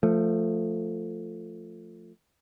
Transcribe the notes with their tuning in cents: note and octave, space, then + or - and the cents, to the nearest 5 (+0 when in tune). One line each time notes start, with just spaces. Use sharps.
F3 +0 A3 +15